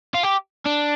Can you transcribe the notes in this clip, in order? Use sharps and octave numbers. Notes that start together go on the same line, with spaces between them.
F4
G4
D4